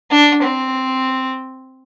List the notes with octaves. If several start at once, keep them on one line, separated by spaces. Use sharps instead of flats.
D4
C4